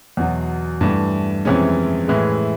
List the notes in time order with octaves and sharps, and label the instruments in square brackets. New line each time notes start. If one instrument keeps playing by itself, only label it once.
[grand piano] E2 B2 F#3
G2 E3 A3
F2 C3 E3 G#3 C#4
A2 E3 G#3